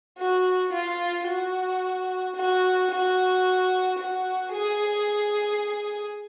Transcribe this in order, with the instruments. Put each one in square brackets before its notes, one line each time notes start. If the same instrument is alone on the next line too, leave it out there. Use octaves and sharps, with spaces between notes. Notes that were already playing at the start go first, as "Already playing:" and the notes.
[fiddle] F#4
F4
F#4
F#4
F#4
F#4
G#4